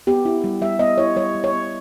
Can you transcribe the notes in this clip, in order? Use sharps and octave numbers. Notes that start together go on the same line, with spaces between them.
B3 G4
E4
G3
G3 E5
B3 D#5
E4 C#5
G3 C#5
G3
C#5
B3